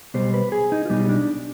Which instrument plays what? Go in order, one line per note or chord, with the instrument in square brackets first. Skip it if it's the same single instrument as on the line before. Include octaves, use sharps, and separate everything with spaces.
[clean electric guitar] B1 B2 G3 C5
B4
G#4
D#4
F4
B1 B2 G3 D#4
D4